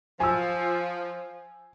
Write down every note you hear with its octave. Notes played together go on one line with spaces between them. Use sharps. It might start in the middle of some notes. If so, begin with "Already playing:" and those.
F3 G#5 E6